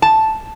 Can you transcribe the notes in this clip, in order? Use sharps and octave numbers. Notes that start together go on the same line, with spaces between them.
A5